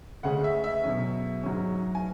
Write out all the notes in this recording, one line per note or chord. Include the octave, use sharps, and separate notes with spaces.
D2 C#3 G#3 C#4 F#5
E5
E5
B2 F#3 C#4
G#2 F#3 C#4
G#5